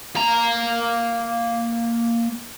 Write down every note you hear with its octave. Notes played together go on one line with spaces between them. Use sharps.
A#3 A#5